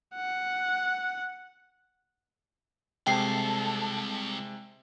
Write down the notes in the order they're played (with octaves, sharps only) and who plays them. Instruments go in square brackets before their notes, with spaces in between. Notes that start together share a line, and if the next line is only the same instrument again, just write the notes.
[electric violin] F#5
[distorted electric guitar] C2 [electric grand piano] C3 G#3 [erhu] A4 [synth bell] G5 C7